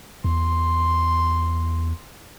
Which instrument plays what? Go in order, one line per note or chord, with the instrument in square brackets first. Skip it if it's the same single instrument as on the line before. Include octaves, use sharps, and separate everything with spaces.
[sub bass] E2 [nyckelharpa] C6